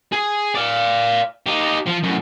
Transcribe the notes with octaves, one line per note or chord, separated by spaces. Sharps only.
G#4
D5 F5
D#4 G4
F3
F#2 A2